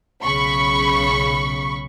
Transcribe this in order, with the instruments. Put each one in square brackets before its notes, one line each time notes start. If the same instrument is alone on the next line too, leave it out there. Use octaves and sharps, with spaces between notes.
[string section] B1 C#3 B5 C#6